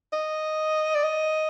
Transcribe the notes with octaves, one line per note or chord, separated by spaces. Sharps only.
D#5
D5
D#5